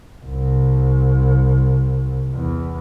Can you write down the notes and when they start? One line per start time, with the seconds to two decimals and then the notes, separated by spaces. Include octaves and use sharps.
0.24 C2
2.35 E2